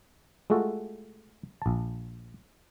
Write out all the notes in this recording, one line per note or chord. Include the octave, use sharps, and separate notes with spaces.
G#3 A3 F4 F#4 A4
A#1 A5